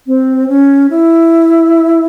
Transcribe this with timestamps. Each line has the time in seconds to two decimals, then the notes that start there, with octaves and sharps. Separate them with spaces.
0.07 C4
0.49 C#4
0.90 E4